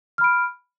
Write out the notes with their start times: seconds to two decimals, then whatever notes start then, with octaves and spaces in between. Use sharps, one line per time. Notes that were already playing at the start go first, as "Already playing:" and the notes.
0.18 F6
0.21 B5
0.24 D7